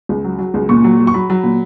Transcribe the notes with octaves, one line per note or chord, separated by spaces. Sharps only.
C#2
F#3
F#3
C#2
A#2 C#6
F#3
F#3
C#6
F#3 B5
F#3
A#2